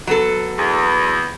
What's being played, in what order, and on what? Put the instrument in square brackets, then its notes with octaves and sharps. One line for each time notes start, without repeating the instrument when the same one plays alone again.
[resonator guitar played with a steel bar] F#3 B3 A4
[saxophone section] E2